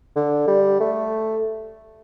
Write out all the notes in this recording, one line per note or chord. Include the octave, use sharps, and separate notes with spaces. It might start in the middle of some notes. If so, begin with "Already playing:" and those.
D3
G3
A3